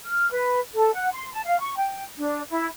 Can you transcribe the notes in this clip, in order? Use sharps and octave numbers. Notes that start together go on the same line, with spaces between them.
F6
B4
A4
F#5
C6
A5
F5
C#6
G5
D4
E4